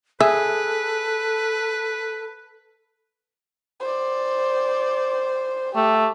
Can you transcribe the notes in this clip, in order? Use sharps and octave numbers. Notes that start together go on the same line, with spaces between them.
G#4 A4 B4 E5
C5 D5
A3 G4